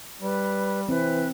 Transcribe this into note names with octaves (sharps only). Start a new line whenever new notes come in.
G3 B4
E3 C4 B4